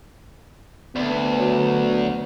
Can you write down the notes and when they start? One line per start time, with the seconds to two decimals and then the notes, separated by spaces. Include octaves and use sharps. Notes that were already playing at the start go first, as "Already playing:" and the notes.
0.96 D2 B3
1.39 F#3